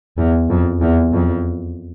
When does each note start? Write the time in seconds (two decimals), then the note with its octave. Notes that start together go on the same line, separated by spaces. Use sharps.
0.17 E2
0.50 F2
0.81 E2
1.13 F2